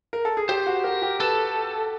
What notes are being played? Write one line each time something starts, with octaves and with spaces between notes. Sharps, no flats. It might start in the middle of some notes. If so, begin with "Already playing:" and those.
A#4
A4
G#4
G4 C5
F#4
G4 A#4
G4
A4 B4